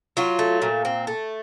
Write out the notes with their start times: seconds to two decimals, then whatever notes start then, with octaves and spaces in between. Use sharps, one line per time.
0.17 F#3 F4
0.39 A3
0.62 A#2
0.85 C4
1.07 A3